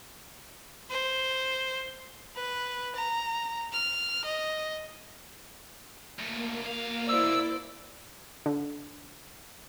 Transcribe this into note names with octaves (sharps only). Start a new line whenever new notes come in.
C5
B4
A#5
F6
D#5
D2 A2 A#3
B2 F5
E4 C5 D5 E6
D3